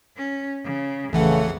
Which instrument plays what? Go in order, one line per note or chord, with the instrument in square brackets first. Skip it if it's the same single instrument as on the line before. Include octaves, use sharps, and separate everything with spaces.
[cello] C#4
C#3
[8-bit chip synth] A1 E3 F#5 [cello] F2 [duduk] C#3 [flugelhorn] A3